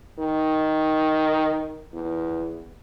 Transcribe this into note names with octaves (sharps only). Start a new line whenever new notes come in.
D#3
E2